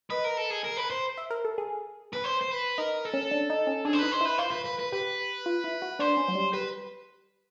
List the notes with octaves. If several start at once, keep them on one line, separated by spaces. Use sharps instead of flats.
B4 D#5
A#4
A4
G#4
A#4
B4
C5
E5
A#4
A4
G#4
B4
C5
C5
B4
D#4 A#4
A4
C#4
D4
D#4
C#4
D4 G#4
C5
D#4 B4
C5
E4 B4
F4 C5
B4
B4
B4
G4 B4
F4
E4
F#4
D4 C5
C#4
F#3
G3
G3 B4